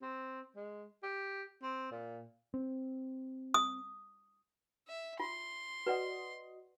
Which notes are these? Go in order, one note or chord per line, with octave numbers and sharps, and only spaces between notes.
C4
G#3
G4
C4
A#2
C4
D#6
E5
F4 C6
F#4 B4 D5 D#5 F#5